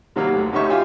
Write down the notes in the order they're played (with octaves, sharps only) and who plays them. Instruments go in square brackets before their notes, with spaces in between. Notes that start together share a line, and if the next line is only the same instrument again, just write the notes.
[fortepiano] C3 D#3 F#3 G3 A#3
D2 A3
F#2 D#4 G4 C#5 E5 C#6
F4 G4 E5 F5 G5 G#5